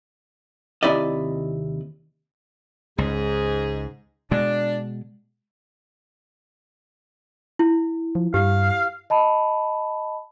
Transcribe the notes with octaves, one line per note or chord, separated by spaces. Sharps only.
D#2 C3 E4 D5 D#5
C#2 G#2 G#4
B2 G#3 D4
E4
F3
G2 G4 F5
D#5 A5 B5